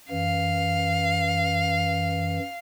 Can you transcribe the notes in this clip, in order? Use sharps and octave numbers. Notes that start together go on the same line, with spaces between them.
F#2 E3 F5